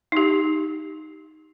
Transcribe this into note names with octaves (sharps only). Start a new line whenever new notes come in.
D#4 G4